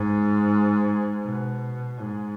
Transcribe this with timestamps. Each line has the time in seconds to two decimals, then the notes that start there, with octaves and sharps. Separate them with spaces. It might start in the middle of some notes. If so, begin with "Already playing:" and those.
Already playing: G#2
1.24 B2
2.01 G#2